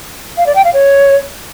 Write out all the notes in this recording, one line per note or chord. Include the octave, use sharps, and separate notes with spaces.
F5
D5
G5
F5
C#5